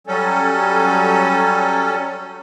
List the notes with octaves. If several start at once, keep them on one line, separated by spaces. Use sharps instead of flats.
F#3 G3 C#4 A4